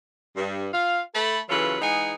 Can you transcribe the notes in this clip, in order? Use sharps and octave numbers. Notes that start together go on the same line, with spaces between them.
G2
F4 F5
A3 A4 A5 B5
C#3 E3 F#3 F4 A4 B4
E3 G#3 D#4 G#4 F#5 G#5